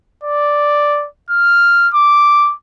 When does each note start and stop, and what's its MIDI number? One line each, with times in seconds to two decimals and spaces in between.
0.24 1.07 74
1.30 1.88 89
1.94 2.54 86